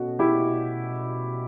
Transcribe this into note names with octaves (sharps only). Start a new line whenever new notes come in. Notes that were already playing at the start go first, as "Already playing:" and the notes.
Already playing: B2 A3 C#4 F#4
E4 G4